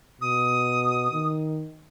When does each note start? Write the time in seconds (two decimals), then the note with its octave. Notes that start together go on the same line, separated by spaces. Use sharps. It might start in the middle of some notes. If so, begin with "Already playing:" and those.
0.21 B2 D#6
1.12 D#3